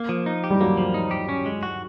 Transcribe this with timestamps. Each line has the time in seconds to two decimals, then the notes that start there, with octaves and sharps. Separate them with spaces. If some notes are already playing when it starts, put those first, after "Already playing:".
Already playing: A#3
0.09 F3
0.26 D#4
0.44 G4
0.50 G3
0.61 F#3 A#3
0.77 F3
0.94 D#4
1.11 G4
1.29 C#4
1.46 G#3
1.63 F#4